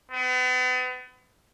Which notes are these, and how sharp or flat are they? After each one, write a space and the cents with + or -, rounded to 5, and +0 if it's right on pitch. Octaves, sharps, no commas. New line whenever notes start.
B3 +40